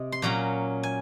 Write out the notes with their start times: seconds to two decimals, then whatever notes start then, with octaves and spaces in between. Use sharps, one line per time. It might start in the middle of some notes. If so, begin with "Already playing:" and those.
Already playing: C3 C4 D#5
0.12 C6
0.22 A#2 F#3 C#4 A#5
0.83 G#5